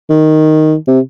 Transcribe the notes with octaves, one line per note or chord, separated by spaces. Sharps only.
D#3
C3